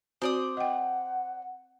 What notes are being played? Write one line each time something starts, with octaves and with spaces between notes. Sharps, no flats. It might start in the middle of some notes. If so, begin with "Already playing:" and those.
C4 F#4 C5 D5 D#6
D#5 F#5 G5